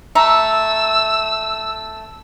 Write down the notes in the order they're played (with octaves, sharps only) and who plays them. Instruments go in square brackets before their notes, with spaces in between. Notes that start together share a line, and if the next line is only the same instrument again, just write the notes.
[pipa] A3 A#5 [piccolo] E6